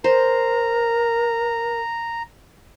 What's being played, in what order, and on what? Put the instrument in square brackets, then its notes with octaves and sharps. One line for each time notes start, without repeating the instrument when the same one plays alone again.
[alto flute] A#4 [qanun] C5 [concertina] A#5